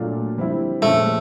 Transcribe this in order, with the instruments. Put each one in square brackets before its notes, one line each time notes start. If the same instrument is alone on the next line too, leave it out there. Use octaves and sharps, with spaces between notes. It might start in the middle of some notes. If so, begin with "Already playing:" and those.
Already playing: [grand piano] A#2 F#3 A3 D4 F4
D3 G3 C4 E4
[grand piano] A#2 F3 G#3 C#4 F4 [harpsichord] A3